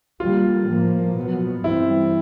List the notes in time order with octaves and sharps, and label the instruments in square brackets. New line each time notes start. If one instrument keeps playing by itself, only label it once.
[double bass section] D3 G3 A#3 [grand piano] F4
[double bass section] A2 F3 A#3
B2 F#3 B3
[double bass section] G2 E3 G3 C4 [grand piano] E4